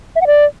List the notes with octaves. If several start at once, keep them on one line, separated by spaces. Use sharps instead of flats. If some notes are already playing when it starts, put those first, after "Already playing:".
E5
F#5
D5